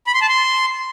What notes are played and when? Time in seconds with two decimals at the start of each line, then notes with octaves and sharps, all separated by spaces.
0.07 B5
0.14 C6
0.21 A5
0.29 C6